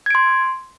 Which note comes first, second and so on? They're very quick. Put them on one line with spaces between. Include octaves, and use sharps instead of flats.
G#6 D7 C6